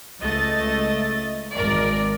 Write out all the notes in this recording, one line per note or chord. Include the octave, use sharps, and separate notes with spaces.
C#2 A3 D#5 A6
G#1 A#4 D5